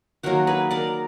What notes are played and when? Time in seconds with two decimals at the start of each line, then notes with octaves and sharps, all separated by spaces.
0.23 D#3 F#3 A#3 F#4 A#4
0.47 G#4 B4
0.71 A#4 D5